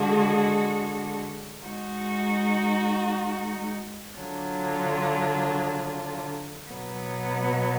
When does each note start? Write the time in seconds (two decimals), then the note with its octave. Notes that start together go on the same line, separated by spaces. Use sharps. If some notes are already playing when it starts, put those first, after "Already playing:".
Already playing: D3 G#3 D4 F#4
1.66 G#3 D#4 F#4
4.19 D3 F#3 D4 F4
6.72 B2 F#3 B3